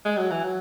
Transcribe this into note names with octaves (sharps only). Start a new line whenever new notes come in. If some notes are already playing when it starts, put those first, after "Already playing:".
G#3
F#3
E3
F#3